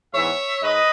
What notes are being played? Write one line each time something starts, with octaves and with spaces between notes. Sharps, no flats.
G#2 E3 B3 C#5 E5
G#2 B4 D#5